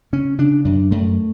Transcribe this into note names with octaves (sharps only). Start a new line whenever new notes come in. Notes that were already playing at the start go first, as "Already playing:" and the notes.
C#3 C#4
C#3 D4
F#2 D4
F#2 A3